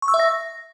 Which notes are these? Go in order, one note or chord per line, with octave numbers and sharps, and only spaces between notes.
C#6
E6
E5
A#6